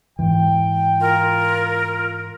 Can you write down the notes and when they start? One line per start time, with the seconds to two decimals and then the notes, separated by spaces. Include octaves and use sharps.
0.19 G#2 E3 G5
1.01 F4 A#4